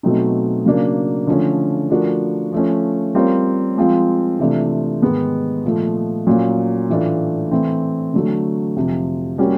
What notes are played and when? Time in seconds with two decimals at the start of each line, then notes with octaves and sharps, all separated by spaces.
0.03 B2 F#3 A3 C4 D#4
0.65 C#3 F#3 A#3 D4
1.27 D3 F3 A3 C#4
1.90 F3 A3 D4 F#4 A#4
2.52 F3 A3 C#4
3.15 G3 C4 F4 A#4 C#5
3.77 F3 G#3 C4 F4
4.39 C3 E3 A3 D4 F4
5.02 G#2 D#3 G#3 B3
5.64 A#2 F3 A3
6.27 A#2 F#3 A#3 C#4
6.90 A2 E3 A3 D4 F4
7.51 E3 A3 C4
8.14 D3 F#3 A3
8.76 F2 C3 F3
9.38 G3 A#3 C#4 F#4